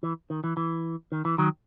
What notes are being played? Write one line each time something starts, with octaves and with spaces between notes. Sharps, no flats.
E3
D#3
E3
E3
D#3
E3
D#3 F#3